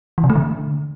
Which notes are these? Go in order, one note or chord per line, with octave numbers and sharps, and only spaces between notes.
E3
C3
A3
D3